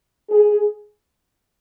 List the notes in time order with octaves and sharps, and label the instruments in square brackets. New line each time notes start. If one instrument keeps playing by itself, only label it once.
[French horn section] G#4